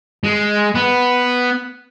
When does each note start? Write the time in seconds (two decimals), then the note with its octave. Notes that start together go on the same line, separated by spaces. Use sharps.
0.24 G#3
0.75 B3